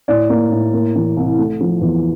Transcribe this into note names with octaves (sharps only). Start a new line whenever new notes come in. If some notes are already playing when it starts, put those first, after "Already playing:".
A2 D5
A#3
A2
A#3
E3
C2
A3
F3
E2